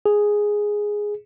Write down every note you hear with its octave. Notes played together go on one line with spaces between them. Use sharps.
G#4